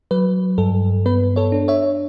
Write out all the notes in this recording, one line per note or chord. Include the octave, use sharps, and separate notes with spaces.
F#3 B4
G2 A4
B3 B4
A4 C#5
D4
C#5 E5